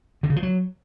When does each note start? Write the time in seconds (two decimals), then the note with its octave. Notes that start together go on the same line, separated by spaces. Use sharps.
0.23 D3
0.30 C#3
0.36 F3
0.43 F#3